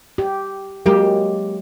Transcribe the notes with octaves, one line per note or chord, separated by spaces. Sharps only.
G4
F#3 G#3 A#3 G4